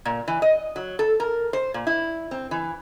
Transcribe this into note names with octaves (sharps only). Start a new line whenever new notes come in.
A#2
E3
D#5
F#3
A4
A#4
C5
A#2
E4
C4
E3